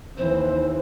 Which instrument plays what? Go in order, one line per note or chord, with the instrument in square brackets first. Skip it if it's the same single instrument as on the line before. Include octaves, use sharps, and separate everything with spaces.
[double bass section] D#2 E3 C4 [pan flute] C5